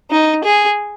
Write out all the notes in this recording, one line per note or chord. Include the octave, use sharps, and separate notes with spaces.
D#4
G#4